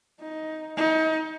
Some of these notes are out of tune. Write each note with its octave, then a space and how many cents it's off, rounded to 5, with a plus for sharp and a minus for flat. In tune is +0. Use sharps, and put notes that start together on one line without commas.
D#4 +10
D#4 +35